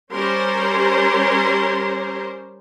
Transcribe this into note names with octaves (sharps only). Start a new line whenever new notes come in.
G3 C#4 A#4 C5 C#5 C6